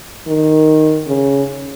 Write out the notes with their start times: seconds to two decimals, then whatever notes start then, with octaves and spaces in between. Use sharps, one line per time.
0.28 D#3
1.07 C#3